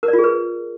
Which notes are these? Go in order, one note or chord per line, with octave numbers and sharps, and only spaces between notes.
A#4
D5
F4
G#4
B4